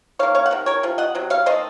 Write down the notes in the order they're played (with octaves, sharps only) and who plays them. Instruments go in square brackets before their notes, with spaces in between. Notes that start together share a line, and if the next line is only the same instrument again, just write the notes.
[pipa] D#3 A#3 C#5 F5
C#5 F5
F#5
C3 D#3
A#4 C#5
C3 F3
D#5 F#5
C3 F#3
C#5 F5
D#3 A3 C5 D#5